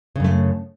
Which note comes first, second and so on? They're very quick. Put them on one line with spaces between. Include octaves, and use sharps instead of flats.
C#3 F#2 A3